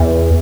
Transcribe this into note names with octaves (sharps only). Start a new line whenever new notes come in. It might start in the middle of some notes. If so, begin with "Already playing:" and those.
Already playing: E2